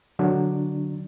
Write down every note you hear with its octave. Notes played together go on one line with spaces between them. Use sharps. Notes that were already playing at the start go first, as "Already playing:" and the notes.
D3 F#3 D4